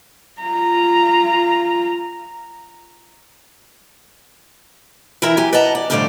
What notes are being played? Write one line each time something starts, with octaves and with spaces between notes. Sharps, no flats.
F4 A#5
E3 E4 A#4 E5
F#3 G4 G#5
B4 D#5 F#5 A5 A#5
D5
F2 A2 D3 G3 D5 F5